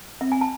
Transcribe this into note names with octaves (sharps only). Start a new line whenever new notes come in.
C4 E5
G#5
A5